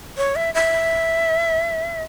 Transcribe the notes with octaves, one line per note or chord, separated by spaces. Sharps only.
C#5
E5
E5